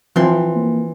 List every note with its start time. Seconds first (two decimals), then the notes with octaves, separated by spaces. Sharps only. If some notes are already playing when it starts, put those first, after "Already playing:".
0.16 E3 F3 C4 C6
0.56 A#3